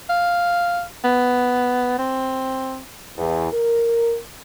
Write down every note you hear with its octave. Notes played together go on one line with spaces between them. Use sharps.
F5
B3
C4
E2
A#4